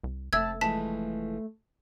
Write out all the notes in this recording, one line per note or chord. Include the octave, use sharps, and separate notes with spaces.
C2
F1 A3 C4 E5 A5 E6 G#6
E3 F3 G#3 A3 A5 B6